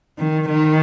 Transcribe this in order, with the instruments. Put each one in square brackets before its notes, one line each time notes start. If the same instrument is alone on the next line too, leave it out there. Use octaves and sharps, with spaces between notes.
[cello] D#3
D#3